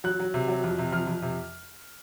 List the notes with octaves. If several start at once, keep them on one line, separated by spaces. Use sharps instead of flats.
F#3 F#6
F#3
C3
F#3
F2
C3
F2 F6
F2
C3